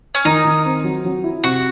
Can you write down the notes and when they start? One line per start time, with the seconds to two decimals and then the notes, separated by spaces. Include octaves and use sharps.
0.15 C#4
0.25 D#3 D#4
0.45 D#3
0.65 C4
0.84 F#3
1.05 F#3
1.24 E4
1.44 C3 F#4